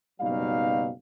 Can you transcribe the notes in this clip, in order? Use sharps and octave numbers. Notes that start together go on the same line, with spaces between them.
F#1 B2 F#3 G3 D#4 F5